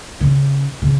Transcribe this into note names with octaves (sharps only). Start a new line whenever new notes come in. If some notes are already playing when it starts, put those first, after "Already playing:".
C#3
C#3